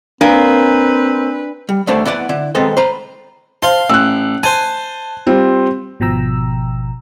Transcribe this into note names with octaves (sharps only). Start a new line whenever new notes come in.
A#3 C4 D4 B4
G3
D#2 D3 A3 C5 D5 A5
B3 E4 D5 F#5
D3 E4
D#3 G#3 B3 C4 A4 C5
C5 A#5 B5
C5 F5 A5 C6
A1 E6 F#6
C5 G#5 A5
G3 C4 F4
G#1 B2 F3 G5 A#5 E6